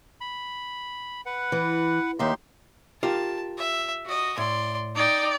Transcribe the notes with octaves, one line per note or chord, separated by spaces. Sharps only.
B5
B4 F#5
E3
D#2 D#4 G4 E5 C6
F4 G4 A#4 A5
E5
F#4 D#5
A2 D5 C6
D#4 D5 G5